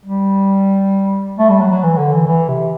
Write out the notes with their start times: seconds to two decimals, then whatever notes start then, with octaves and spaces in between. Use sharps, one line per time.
0.05 G3
1.39 A3
1.50 G3
1.61 F#3
1.71 F#3
1.83 E3
1.98 D3
2.13 E3
2.27 E3
2.48 C3